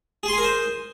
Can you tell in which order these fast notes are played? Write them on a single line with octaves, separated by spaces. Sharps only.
G#4 C6 G#5 A#4 C5